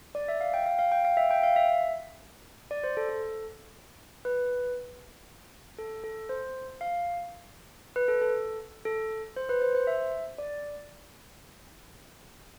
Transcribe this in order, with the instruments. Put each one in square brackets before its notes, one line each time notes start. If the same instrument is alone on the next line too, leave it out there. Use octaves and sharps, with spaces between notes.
[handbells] D5
E5
F5
G5
F5
F5
G5
F5
E5
G5
F5
E5
D5
C5
A4
A4
B4
A4
A4
C5
F5
B4
A4
A4
A4
C5
B4
C5
C5
E5
D5